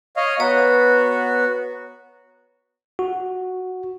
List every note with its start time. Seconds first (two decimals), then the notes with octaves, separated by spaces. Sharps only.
0.16 C#5 D#5 F5
0.40 B3 F#4 B4 C#5 A#5
2.99 F#4